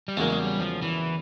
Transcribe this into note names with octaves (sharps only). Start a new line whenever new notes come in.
G3
E2 C#3 F#3 G#3 A#3
G3
F3
E3